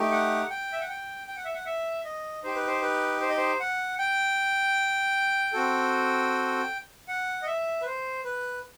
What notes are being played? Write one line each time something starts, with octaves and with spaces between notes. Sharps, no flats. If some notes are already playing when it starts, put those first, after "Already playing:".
Already playing: A3 D#4 G4
F#5
G5
E5
F#5
G5
G5
F#5
E5
F#5
E5
D#5
D#4 G4 C5
B4
C5
B4
C5
D#5
C5
F#5
G5
C4 F#4 A4
F#5
D#5
E5
B4
C5
B4